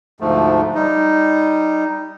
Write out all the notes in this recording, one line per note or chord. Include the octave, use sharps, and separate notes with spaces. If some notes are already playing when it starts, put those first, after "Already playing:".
D2 G#2 F3 A3
G3 D#4